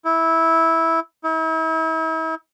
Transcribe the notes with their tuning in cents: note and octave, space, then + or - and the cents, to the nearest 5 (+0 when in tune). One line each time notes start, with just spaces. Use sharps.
E4 -10
E4 -40